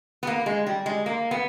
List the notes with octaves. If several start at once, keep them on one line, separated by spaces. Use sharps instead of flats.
B3
A#3
G#3
G3
G#3
A#3
B3